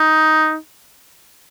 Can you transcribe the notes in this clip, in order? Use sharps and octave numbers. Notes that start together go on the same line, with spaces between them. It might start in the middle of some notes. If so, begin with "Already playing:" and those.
Already playing: D#4